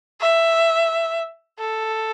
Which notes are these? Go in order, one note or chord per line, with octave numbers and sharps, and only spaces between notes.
E5
A4